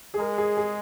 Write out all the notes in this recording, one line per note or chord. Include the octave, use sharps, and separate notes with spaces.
G#4
G#3 A#4
G#4
G#4